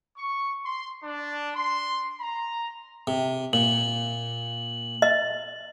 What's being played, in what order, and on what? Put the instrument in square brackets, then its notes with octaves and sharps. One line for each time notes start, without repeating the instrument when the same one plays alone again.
[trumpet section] C#6
C6
D4
C6
A#5
[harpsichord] C3
[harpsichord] A#2 [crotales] F#7
[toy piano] D#5